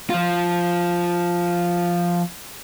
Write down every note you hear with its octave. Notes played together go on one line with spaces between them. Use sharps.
F3 F4